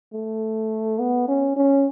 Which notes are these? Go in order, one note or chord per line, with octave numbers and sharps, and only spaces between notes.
A3
B3
C#4
C#4